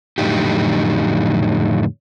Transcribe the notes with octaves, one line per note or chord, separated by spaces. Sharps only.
F2 A2 D3 F#3 D#4 G4